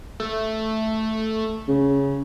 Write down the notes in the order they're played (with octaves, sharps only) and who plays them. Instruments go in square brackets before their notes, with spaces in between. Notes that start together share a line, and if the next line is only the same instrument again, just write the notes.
[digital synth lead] A3
[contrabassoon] C#3